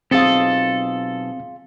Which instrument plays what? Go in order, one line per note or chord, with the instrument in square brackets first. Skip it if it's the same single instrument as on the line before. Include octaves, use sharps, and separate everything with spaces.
[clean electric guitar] B1 A4 [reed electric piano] C4 [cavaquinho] F4 G#4 D#5